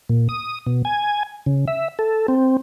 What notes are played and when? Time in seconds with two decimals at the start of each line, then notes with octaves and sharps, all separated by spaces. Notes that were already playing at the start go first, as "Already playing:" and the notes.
0.09 A#2
0.29 D#6
0.66 B2
0.85 G#5
1.46 C#3
1.68 E5
1.99 A4
2.28 C4